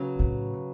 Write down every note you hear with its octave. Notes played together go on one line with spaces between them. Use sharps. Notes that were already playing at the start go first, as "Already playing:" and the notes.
Already playing: C#3 F#3 B3
A2